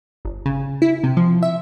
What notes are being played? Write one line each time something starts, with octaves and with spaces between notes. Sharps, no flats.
G1
C#3
E4
C3
F3
E5